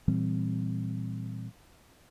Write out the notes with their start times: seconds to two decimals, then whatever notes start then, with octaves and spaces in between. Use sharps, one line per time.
0.08 A#2 E3 G3 C4